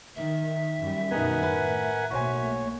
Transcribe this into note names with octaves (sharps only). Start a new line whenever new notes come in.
D#3 E5
F#2 G3
F#2 B2 D#3 B3 D#4 A#4 F#5 G#5
A2 B4
B1 A3 A#3 F#4 C5 C#5 G#5